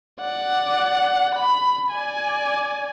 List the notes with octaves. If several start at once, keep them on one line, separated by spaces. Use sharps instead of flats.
D5 F#5
B5
D5 G#5